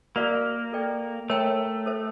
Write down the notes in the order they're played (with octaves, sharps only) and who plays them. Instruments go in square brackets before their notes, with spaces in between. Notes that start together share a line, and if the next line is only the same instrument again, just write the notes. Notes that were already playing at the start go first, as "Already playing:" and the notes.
[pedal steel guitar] A#3 [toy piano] F#4 A#4 D5 F5
[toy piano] A4 D5 G5
[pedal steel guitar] A3 [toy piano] A#4 C#5 E5 G5 A#5
[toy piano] A4 C5 E5